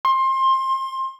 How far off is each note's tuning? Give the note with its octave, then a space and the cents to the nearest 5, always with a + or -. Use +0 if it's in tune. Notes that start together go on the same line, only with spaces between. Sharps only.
C6 +25